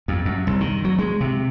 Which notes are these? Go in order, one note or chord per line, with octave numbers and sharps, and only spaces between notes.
F2
F#2
C2
D#3
F#3
G#3
C3